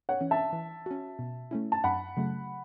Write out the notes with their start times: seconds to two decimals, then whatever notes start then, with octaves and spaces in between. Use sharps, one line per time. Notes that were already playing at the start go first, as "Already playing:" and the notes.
0.09 C#5 F#5
0.21 E3 C#4
0.31 E5 A5
0.53 E3
0.86 C#4 F#4
1.19 B2
1.51 A3 C#4 E4
1.72 A5
1.84 F#2 F#5 B5
2.17 C#3 F#3 A3